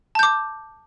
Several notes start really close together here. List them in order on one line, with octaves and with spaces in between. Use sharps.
A5 G6 D6